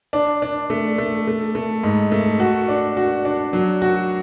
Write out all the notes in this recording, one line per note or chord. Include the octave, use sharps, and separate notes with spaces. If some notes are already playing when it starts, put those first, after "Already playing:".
D4
D4
A3
A3
A3
A3
G#2
A3
F#4
D4
F#4
D4
F#3
F#4